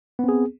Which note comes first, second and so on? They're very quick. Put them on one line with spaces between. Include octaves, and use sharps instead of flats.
B3 C4 G#4